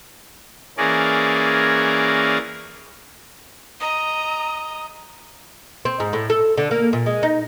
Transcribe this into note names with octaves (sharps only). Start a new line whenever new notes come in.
E3 A#3 C#4 G#4 A#4 D5
D#5 A#5 D#6
C4
G#2
A2
A4
D3
A#3
A#2
G#3
D#4